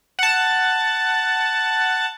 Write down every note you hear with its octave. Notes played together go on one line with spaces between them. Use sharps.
F#5 A5